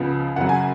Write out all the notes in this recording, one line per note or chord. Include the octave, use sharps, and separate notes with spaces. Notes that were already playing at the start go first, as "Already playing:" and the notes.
Already playing: C#2 C#3 F3 B3
F#2 C#3 F#3 F#5
G#5